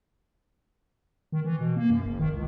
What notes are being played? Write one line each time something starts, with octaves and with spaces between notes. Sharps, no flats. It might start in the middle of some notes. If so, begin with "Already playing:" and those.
D#3
E3
B2
A#3
F#2
F#1
D#3
C#2